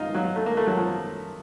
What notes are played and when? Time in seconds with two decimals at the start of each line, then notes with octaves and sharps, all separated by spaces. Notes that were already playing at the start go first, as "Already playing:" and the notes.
Already playing: D#4 F4
0.15 F#3
0.36 A3
0.46 A#3
0.57 A3
0.67 F#3
0.78 F3